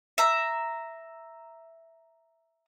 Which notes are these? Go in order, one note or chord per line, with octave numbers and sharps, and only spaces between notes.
E5 A#5